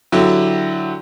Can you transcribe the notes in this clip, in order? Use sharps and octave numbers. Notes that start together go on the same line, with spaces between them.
D3 F#3 E4 G4